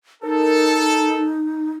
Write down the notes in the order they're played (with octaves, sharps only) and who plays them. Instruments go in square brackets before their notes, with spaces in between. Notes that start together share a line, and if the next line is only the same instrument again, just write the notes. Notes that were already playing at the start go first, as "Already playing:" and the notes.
[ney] D#4 [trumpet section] A4 [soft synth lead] A#4